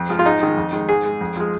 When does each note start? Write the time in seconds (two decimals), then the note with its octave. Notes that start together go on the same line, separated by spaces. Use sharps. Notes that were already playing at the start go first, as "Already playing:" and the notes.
Already playing: F2
0.09 F3 G#3
0.19 F4
0.25 G#2 D#4
0.41 D#3 G#3
0.57 F2
0.73 D#3 G#3
0.89 G#2 G#4
1.05 G#3
1.21 F2
1.37 F3 G#3